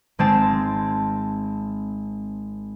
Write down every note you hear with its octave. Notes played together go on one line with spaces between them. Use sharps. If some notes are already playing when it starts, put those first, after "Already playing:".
G#1 G#3 C4 A5 E7